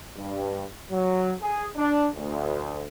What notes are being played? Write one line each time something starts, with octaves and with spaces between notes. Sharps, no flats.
G2
F#3
G#4
D4
D2